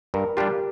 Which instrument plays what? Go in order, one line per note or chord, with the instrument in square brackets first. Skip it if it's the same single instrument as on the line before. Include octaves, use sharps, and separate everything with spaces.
[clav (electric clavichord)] G2 [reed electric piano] A#4
[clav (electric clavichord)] G3 D4 F4 [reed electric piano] G4